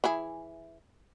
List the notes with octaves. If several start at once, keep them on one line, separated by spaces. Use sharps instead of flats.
E3 E4 G#4